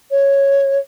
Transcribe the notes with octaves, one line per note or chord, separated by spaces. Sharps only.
C#5